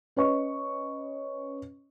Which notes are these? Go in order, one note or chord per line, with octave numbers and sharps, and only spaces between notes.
C#4 B4 C#5 D#5 C#6